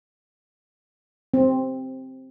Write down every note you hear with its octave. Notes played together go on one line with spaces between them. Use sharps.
C4